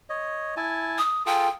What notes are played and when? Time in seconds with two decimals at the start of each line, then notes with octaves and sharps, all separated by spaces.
0.10 C#5 D#5
0.57 E4 G#5 A5
0.98 D#6
1.26 F4 G#4 A4 G5